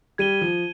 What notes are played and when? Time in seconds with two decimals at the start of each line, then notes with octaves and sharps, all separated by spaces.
0.18 G3 G#6 D#7 G7
0.41 F3